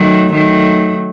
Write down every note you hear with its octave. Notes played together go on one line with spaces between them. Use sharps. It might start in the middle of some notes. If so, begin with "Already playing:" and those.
Already playing: D#3 F#3 A3
D#3 F#3 A3